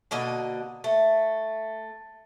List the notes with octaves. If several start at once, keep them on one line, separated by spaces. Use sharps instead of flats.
B2 D3 A#3 D#5
A3